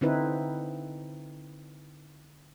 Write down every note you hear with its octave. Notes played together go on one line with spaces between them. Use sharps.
D3 C4 D#4 E4 B4